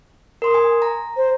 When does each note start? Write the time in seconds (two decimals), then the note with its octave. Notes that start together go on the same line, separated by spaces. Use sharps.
0.42 A#4 C6 D#6
0.54 G#5
0.82 A#5
1.17 C5